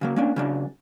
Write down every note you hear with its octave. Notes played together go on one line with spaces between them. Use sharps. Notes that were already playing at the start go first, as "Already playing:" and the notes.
C#3 F#3 A#3
A#3 C#4 D4
C#3 F#3 D4